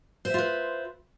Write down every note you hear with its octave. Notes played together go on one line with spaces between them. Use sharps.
F4 B4 C5 E5